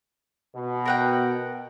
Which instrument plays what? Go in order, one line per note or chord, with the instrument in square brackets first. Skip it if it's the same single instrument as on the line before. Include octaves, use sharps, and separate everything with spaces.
[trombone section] B2
[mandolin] A#4 F#5 G5